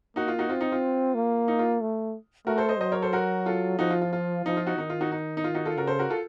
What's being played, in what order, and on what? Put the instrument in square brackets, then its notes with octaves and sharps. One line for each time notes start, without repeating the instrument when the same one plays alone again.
[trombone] A#3 [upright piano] D#4 F#4
[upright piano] F4
D#4 F#4
[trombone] C4 [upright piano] F4
[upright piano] D#4
F4
[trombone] A#3
[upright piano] D#4
F4
[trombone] A3
[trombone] A3 [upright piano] F#4 A#4
[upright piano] A4 C5
C5 D#5
[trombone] F#3 [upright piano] C5 D#5
[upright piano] A#4 C#5
A4 C5
F#4 A#4
F4 A4
[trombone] F3 [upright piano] D#4 F#4
[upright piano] F4
F4
F4
[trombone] F3 [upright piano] D#4
[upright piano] F4
D#4 F#4
[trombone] D#3 [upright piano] D#4
[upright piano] F4
D#4 F#4
D#4
D#4
F4
D#4 F#4
F4 A4
[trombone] C#3 [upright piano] F#4 A#4
[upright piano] A4 C5
F#4 A#4
F4 A4